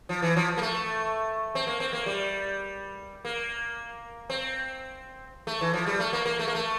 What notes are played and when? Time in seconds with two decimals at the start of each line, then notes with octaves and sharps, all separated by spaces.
0.09 F3
0.22 E3
0.36 F3
0.57 A#3
0.62 A3
1.55 C4
1.67 A#3
1.80 C4
1.93 A#3
2.06 G3
3.25 A#3
4.30 C4
5.47 A3
5.61 E3
5.74 F3
5.86 G3
6.00 A3
6.13 A#3
6.26 A#3
6.39 A3
6.48 A#3
6.55 A3